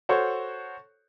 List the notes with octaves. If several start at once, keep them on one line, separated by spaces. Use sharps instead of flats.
F#4 A4 C5 C#5 C#6